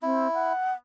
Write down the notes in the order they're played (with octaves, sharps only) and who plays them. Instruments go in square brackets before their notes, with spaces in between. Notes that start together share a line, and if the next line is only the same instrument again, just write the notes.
[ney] C4 [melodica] E4
[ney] F#5